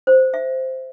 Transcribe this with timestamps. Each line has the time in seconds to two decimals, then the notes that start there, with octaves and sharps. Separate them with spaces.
0.07 C5
0.34 E5